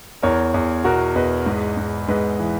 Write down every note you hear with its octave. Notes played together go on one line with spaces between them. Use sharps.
E2 A#4 C#5
E2
B2 F#4 A#4
E2 B4 D#5
G#2
G#2
G#2 B4 D#5
E3